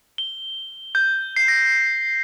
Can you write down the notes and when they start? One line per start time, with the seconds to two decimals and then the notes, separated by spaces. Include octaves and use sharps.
0.18 G7
0.95 G6
1.36 C7
1.48 A#6